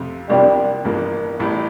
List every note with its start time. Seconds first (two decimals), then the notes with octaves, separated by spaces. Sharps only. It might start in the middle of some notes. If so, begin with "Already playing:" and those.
Already playing: F2 C3 F3 A3
0.29 C2 C3 F3 G3 A#3 D4
0.84 A1 G2 F3 A#3
1.39 A1 A2 G3